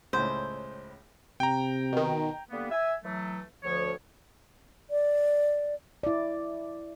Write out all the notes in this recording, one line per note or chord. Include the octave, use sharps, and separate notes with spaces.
C#2 A2 C5
C3 G5 A#5
B2 D#3
D3 G3 A#3 B3
E5 G#5
E3 F#3 A3
D2 F3 C#5
D5
E4 D5